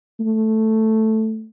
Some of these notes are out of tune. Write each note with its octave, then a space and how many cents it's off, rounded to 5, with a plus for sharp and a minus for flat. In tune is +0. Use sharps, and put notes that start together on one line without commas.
A3 +0